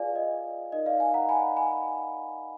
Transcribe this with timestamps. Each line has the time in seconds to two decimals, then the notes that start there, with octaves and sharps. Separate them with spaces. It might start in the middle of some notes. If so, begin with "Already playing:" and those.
Already playing: F4 G#4 B4 D5 F5 G#5
0.16 D#5
0.72 D#4 A#4 D5 D#5
0.86 D5 F5
1.00 F5 G#5
1.14 F#5 A#5
1.29 G#5 B5
1.57 G#5 B5